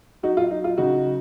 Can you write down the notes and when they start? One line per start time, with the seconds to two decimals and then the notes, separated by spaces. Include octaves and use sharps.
0.23 F#3 D#4 F#4
0.37 F4
0.51 F#3 D#4
0.64 F4
0.78 C#3 D#4 F#4
1.06 F#3